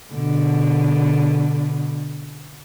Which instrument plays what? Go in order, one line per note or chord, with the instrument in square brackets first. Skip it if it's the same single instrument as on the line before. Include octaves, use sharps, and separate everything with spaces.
[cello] B2 D3